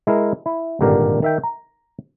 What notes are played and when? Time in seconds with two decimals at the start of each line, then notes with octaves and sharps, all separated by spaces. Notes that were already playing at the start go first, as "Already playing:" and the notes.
0.07 G#3 E4 A#4
0.46 E4
0.81 G#1 G2 A#2 D3 G4 A#4
1.22 D#3 E5 G5
1.43 A#5